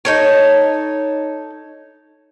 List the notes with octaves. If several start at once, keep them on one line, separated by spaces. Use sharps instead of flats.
D#4 A4 C#5